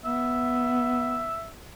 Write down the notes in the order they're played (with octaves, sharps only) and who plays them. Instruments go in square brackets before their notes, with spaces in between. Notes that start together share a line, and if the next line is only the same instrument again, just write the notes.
[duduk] B3 [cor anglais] E5